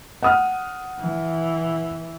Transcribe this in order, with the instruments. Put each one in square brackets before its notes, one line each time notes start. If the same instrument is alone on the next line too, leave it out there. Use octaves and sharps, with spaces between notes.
[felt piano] F#5 D#6 F6
[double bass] E3